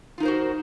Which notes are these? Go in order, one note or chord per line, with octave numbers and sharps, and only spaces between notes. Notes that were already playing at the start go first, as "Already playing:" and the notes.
D#4 F4 F#4 A#4 C5